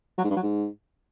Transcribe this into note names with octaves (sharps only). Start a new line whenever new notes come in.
F#3
G#2
G2
F#3
G#2